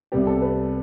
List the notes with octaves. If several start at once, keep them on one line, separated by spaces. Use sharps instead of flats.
C2 C3 G3 B3 G4
A4
B4